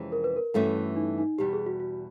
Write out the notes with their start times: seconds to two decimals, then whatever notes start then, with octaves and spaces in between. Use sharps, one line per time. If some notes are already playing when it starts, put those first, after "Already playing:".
Already playing: F2 C3 E3 G#3 C#4
0.12 A#4
0.24 B4
0.36 A#4
0.54 G2 E3 A3 C#4 F#4 A4
0.96 D#4
1.18 D#4
1.38 E2 B2 G3 G4
1.53 G#4
1.66 F#4
1.80 F#4